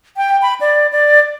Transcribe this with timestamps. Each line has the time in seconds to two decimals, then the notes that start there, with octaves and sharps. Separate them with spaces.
0.17 G5
0.42 B5
0.61 D5
0.92 D5